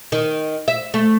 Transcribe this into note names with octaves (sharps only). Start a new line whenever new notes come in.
D#3
E5
A3